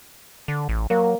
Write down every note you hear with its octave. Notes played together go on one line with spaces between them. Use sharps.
D3
A1
F#3 A#3